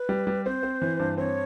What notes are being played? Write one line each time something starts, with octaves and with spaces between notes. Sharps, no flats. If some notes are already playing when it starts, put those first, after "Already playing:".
Already playing: B4
G3
G3
C4 C5
C4
E3
G2
C4 C#5